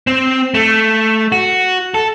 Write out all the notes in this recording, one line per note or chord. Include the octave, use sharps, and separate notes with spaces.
C4
A3
F#4
A4